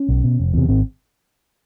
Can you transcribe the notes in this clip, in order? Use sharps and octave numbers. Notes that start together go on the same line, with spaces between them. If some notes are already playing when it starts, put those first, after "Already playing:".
Already playing: C#4
B1
B2
F1
E2 C3
G#1 C4